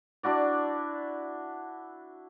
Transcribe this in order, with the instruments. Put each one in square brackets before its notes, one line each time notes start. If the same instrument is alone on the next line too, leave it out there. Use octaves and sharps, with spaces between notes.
[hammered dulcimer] D4 E4 F#4 D5